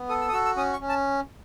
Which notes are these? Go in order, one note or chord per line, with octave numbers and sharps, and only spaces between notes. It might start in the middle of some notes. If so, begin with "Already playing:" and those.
Already playing: B3
A4 D#6
E6
D#6
F#4 E6
E6
C#4 D#6
C#6
C#4
A5